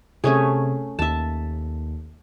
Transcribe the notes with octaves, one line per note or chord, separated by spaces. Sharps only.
C3 A3 C#4 G#4
D#2 E5 A5